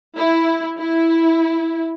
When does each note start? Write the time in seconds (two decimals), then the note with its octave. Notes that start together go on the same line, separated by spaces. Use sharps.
0.17 E4
0.79 E4